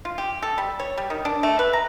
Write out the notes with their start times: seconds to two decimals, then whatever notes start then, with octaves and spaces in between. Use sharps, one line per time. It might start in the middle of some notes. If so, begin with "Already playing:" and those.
0.05 F4
0.18 G4
0.42 A4
0.58 G3
0.80 C#5
0.98 G3
1.10 D#3
1.25 D4
1.43 A3
1.59 B4
1.73 A#5